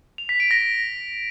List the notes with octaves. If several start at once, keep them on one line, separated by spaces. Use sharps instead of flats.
F7
B6
D7
A#6